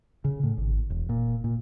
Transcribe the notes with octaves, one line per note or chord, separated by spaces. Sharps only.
C#3
A2
G#1
E1
A#2
A#2